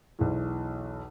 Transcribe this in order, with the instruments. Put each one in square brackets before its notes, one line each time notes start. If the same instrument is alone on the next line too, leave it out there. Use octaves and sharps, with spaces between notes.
[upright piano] B1 E2